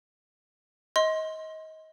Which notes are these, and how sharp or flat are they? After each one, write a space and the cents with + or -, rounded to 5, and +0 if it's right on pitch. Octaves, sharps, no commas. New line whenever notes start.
D#5 +25 C6 +10